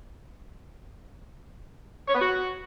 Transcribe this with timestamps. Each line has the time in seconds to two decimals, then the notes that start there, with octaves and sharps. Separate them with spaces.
2.08 C#5
2.15 B3
2.21 F#4